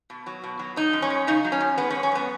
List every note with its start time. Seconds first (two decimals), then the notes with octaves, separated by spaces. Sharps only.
0.10 B2
0.26 F#3
0.44 B2
0.59 F#3
0.76 F#3 D#4
0.93 F#2
1.02 C#4
1.10 F#2
1.27 C#3 D#4
1.44 F#3
1.52 C#4
1.60 F#2
1.78 G#3 B3
1.90 C#4
1.95 F#2
2.03 C#4
2.12 F#2 B3